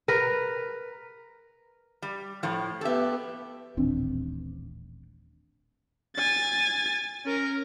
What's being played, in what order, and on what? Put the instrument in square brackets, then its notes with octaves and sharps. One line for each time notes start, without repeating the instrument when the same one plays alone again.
[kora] A#4 B4
[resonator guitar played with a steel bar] G3
A2 F3
[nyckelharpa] B3 G4 [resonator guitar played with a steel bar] A4 E5
[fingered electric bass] D#1 A1 C4 D4
[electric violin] G#5 A6
C#4 A#4